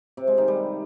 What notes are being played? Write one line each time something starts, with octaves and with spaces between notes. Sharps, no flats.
C3
G#3
D#3
G3